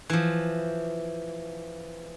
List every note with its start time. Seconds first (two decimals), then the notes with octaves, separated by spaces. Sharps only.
0.10 E3 F3